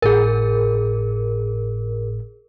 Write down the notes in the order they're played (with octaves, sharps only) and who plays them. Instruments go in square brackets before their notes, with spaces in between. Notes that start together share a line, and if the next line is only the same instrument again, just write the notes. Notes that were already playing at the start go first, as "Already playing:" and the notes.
[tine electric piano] G#1 A2 [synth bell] G#4 A#4